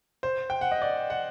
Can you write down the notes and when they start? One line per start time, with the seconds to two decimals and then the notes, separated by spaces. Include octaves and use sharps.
0.23 C5
0.50 G5
0.61 F#5
0.71 D#5
0.82 D5
1.10 F#5